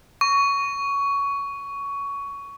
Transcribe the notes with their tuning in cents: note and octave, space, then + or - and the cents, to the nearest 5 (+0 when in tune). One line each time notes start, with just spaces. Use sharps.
C#6 +15